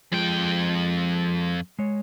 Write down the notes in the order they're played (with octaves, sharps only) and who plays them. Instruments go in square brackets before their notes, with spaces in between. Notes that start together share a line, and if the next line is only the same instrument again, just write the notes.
[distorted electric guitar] F2 G5 [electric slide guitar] F3 G#3
[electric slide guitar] G#3 C#5